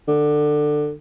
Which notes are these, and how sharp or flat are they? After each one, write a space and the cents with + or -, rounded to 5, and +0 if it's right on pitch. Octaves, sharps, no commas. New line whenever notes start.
D3 +20